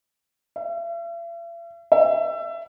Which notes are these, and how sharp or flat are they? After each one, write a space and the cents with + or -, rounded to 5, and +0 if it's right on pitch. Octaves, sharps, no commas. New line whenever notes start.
E5 +45
E5 +25